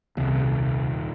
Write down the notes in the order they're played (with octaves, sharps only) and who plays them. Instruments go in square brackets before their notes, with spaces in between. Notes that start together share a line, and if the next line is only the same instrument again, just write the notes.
[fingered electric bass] D#1 [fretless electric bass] C2